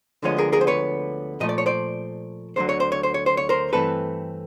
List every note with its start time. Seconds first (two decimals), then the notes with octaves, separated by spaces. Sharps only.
0.23 D2 D3 F3 G#3 B3 C#5 D#5
0.38 G#4 A#4
0.53 G#4 A#4
0.61 C5
0.67 B4 C#5
1.40 A#2 F3 A3 D#5
1.49 D5
1.58 C#5
1.66 C5 D5
2.56 D2 D3 F#3 C5
2.69 C#5
2.80 C5
2.92 C#5
3.03 C5
3.14 C#5
3.26 C5
3.37 C#5
3.49 A#4 C5
3.73 G2 E3 A3 C4 A4 B4